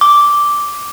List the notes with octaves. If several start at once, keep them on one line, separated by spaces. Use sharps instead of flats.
D6